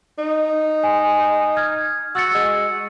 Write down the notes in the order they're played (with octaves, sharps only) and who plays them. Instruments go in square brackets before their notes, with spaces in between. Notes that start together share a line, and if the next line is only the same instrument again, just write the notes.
[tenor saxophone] D#4
[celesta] G#5
F6 G#6
[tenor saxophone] F#4 [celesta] E6 A6 C#7
[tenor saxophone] G#3